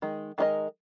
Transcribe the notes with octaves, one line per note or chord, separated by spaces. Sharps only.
D#3 G#3
D#3 G#3 D#4 A#4 D#5